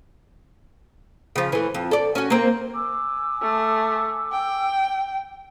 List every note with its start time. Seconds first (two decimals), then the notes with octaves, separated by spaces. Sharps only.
1.36 C#3 F3
1.52 E3 A3
1.74 F2
1.91 A4 D5
2.15 C#4 F#4
2.30 A#3 C4
2.75 G#5 D6 E6
3.41 A3
4.32 G5